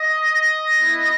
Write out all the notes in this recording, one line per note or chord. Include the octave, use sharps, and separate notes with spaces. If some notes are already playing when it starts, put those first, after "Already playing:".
Already playing: D#5
B3 E4